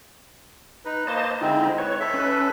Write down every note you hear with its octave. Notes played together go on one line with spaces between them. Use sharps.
D#4 B4
A#3 C5 D#5 A5
D3 G#3 C4 D#4 E4
B4 C#5
A4 E5
C#4 B4